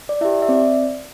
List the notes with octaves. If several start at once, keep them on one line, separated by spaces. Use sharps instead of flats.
D5
E4 G4 E5
E5
C4 D5